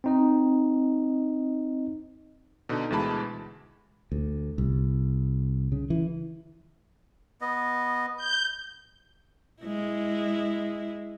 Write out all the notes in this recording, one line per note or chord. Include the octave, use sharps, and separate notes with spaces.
C4 D#4 D#5
B2 D3 D#4
D2 B2 E3 G#3 A5 B5
D2
C2
C#3
E3
B3 D#5
G6
G#3 E4